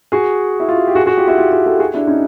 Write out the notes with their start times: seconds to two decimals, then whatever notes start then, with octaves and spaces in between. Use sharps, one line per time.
0.12 F#4 G#4
0.60 E4
0.69 F4
0.78 F#4
0.87 G4
0.95 F#4 G#4
1.06 F#4 G#4
1.18 F4 G4
1.27 E4 F#4
1.37 F4 G4
1.52 F#4 G#4
1.66 G4 A4
1.79 F#4 G#4
1.94 D4 E4
2.07 C#4 D#4